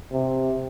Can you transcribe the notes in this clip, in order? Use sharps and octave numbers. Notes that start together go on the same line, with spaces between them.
C3